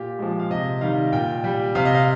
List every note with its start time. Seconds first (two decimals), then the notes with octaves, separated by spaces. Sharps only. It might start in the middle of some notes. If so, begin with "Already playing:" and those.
Already playing: A#2 G4
0.19 F3 G#3
0.39 F5
0.50 C3 D#5
0.81 D#3 G3 F5
1.12 A#2 G5
1.44 G3
1.75 C3 F5
1.85 D#5
1.95 F5